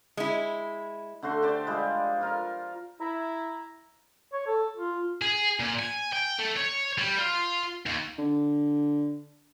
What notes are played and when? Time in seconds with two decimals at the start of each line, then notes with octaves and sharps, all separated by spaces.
0.17 G#3 E4
1.23 D3 A3 F#4 C6
1.42 G4 C5 D5
1.67 F3 G3 G#3
2.21 F4 A#4 F5
3.00 E4 A#5
4.33 C#5
4.47 A4
4.77 F4
5.22 G#4
5.60 A#2
5.79 G#5
6.13 G5
6.39 A3
6.57 C#5
6.98 G3
7.18 F4
7.86 D#2
8.18 D3